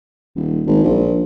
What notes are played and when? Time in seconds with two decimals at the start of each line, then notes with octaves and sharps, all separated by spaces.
0.36 D#1
0.67 G#1
0.84 A#1